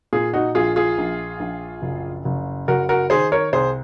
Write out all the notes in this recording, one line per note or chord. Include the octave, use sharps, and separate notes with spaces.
A#2 F4 G#4
D#4 F#4
A#1 F4 G#4
F4 G#4
A#1
A#1
F#1
F#1
F#1 F#4 A#4
F#4 A#4
D#3 G#4 C5
A#4 C#5
C2 G#4 C5